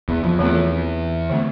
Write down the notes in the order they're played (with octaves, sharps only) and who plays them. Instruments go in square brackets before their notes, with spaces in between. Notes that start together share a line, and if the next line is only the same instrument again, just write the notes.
[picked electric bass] E2
F2
[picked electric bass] E2 [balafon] E3 A3 C4 F4 A4
[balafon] D3 A3 C4